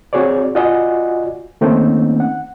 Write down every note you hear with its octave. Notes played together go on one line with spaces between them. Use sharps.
C4 F#4 G#4 C#5 D5
F4 F#4 D5 D#5 F#5 G#5
D#3 A3 A#3 C4 C#4 D#4
F#5